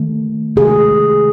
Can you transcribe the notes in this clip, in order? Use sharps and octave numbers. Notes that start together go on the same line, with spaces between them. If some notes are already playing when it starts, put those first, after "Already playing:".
Already playing: D#3 A3
C3 D#3 A3 G#4